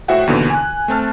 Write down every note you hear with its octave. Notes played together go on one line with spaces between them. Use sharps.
A2 F#4 C5 E5 F#5 G5
D#2 B2 D3 E3
G#5 F#6
A3 C4 A5 F6